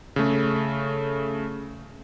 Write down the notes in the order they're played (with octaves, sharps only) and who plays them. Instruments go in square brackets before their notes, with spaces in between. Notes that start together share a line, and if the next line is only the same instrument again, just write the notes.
[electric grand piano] C#3 A3